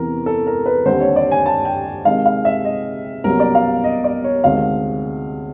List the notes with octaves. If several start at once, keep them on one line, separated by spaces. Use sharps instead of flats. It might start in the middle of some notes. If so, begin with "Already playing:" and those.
Already playing: E2 C3 E3 A#4
A4
A#4
B4
D#2 D3 G3 C4 C5
C#5
D5
G#5
A5
G5
C3 D#3 G#3 F5
F5
E5
D#5
C2 B2 F#3 A#3 C#4 A#4
D5
F5
D#5
D5
C#5
D2 C3 D#3 G#3 F5